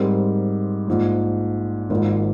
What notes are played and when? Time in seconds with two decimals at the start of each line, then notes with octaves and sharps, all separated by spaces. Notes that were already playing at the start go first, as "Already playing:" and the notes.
Already playing: G#2 G3 C4 G4 A#4
0.88 A#1 G#2 F3
1.90 G#1 G#2 F3 A#3